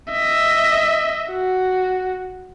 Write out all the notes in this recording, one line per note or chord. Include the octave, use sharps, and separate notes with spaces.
D#5 E5
F#4